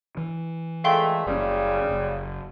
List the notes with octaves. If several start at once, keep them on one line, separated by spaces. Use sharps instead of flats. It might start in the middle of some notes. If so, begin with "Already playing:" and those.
E3
A#2 G#3 A3 F5 G5 C6
F#1 C#3 G3 C#4
F#1